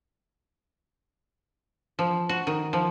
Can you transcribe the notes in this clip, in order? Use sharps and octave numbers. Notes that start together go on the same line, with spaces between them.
F3
F#4
D#3
F3